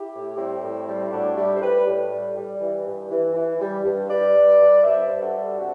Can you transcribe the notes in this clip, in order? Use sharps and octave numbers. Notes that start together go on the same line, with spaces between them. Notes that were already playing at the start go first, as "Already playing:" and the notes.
Already playing: E4 G4
A2
G3 C4 E4
A2
G3
A2 D4 F#4
G3 E4 G4
C5
G3 G4 B4
A2
G3
G3
E3
G2
E3
E3
G3
G2
G3 B4 D5
G2
G2
G2 C5 E5
G2
F#4 A4
G3
C3 D4 F#4